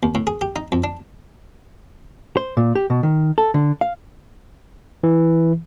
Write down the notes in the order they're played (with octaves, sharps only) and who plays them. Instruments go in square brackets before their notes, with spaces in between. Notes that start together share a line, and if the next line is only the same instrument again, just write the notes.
[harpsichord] D#2
A2
G#4
G4
D#4
F2
D4
[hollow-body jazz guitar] C5
A#2
G4
B2
D#3
A4
D3
F5
[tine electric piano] E3